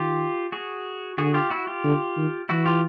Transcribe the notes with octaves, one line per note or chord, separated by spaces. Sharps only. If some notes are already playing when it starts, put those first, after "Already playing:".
Already playing: D#3 F4 G4
F#4 G#4
D3 F#4 G#4
F4 G4
E4 F#4
F4 G4
D3
D#3
E3 E4 F#4
F4 G4